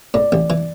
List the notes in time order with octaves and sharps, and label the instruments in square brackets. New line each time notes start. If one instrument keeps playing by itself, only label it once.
[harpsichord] A2 [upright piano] D5
[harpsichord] A1
E3